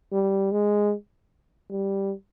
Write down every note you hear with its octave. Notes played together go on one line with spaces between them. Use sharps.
G3
G#3
G3